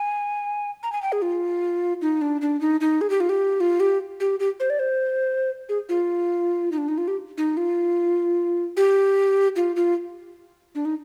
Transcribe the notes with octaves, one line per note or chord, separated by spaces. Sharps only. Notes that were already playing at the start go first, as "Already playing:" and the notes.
Already playing: G#5
A#5
G#5
G5
G#4
F4
D#4
D4
D4
D#4
D#4
G#4
G4
F4
G4
F4
G4
G4
G4
C5
D5
C5
G#4
F4
D#4
D4
D#4
F4
G4
D#4
F4
G4
F4
F4
D4
D#4